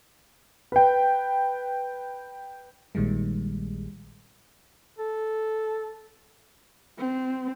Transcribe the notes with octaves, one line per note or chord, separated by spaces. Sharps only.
B4 G5
A#1 A#2 D#3 G3 G#3
A4
C4